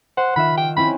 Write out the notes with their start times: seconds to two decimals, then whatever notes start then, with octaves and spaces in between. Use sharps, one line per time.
0.17 C5 F#5
0.36 D#3 F4 E5 B5
0.57 G5
0.77 C4 C#4 E4 B5